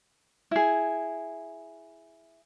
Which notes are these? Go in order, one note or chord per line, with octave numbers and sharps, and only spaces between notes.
E4 G#4